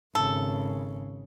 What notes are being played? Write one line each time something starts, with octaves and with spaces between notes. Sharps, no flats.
G#1 C#3 A4